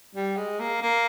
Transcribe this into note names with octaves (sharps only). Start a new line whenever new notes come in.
G3
G#3
A#3
A#3